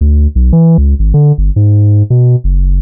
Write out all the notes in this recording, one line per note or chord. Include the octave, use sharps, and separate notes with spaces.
D2
B1
E3
C#2
G#1
D3
G1
G#2
B2
F#1